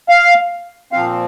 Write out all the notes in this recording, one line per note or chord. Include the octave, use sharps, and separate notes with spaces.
F5
A#2 F3 C4 F5